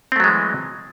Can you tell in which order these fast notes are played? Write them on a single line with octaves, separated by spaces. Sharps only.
C4 A3 F#3 G#3 E3